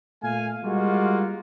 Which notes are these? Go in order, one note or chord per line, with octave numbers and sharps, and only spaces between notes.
A#2 A3 F5 G#5
G3 G#3 A#3 F4 F#4